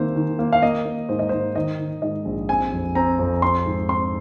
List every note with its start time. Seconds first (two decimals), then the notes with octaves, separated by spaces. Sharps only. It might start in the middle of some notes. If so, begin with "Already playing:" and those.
Already playing: C2 D#3 A#3 C4 C5
0.16 D#3
0.39 A#3
0.53 F5
0.62 A#3 D#5
0.86 A#3
1.09 G#2 C5
1.19 D#5
1.29 G#2 C5
1.55 D#3 D#5
1.79 D#3
2.02 G#2 D#5
2.25 A#1
2.49 C4 G#5
2.72 F2
2.95 C4 A#5
3.19 F2
3.42 C4 C6
3.66 G#2
3.88 C4 C6